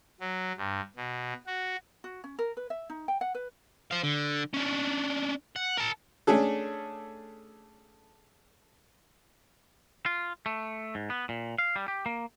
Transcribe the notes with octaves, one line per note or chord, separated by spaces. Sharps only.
F#3
G2
B2
F#4
F#4
C#4
A#4
B4
E5
D#4
G5
F#5
B4
C5 F5
D3
C#4 D4
F#5
A#4 A5
A3 C#4 D4 G#4 A4
F4
A3
G#2
B3
A#2
F5
G3
G4
A#3